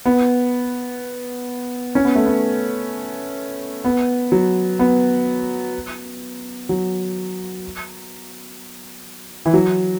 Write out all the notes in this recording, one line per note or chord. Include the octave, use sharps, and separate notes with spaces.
B3
C#4
B3
A3
B3
B3
F#3
B3
F#3
E3
F#3